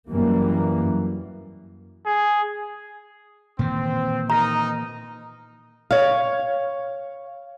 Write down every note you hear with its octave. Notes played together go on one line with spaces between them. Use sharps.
F#2 E3 G3 A#3
G#4
A#2 D#3 E3 C4
D#4 A#4 D#5 A#5
C#5 F5